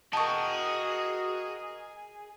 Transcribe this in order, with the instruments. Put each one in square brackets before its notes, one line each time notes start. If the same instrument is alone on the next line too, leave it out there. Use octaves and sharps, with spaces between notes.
[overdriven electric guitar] F#4 G5 [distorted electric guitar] G#4 [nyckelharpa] A#4 D#5 [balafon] A5 C#6